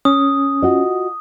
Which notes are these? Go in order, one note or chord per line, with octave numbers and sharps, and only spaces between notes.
C#4 D#6
F4 F#4 D#5